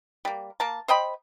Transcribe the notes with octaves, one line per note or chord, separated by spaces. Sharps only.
G3 A#3
A#3 A#4 A5
C5 D#5 G5 B5